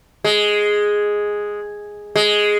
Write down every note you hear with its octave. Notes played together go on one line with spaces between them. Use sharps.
G#3
G#3